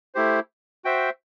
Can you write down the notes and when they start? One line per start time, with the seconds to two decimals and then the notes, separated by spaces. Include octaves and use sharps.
0.15 A3 E4 G4 C5
0.85 F#4 C5 E5 G5